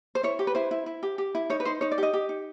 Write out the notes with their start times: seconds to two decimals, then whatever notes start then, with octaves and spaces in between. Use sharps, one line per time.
0.15 C5
0.23 E4 C#5
0.39 G4
0.47 B4
0.55 E4 C5
0.71 E4
0.86 E4
1.03 G4
1.18 G4
1.35 E4
1.50 D#4 C#5
1.60 B4
1.65 D#4 C5
1.81 D#4 C#5
1.92 D5
1.98 G4 D#5
2.13 G4
2.29 D#4